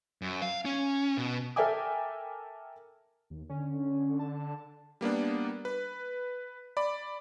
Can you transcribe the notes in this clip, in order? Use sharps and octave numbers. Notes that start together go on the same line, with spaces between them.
F#2
F5
C#4
B2
A4 A#4 E5 G5 G#5 D6
D#2
D3 C#4
A5
G3 A#3 B3 D4
B4
D5 B5 D6